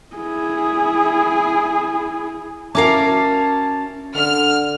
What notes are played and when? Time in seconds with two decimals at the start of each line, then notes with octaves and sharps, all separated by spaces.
0.16 E4 G#4
2.75 C#4 E4 F#4 A#4 F5 A5 A#5 D6
4.15 D3 F6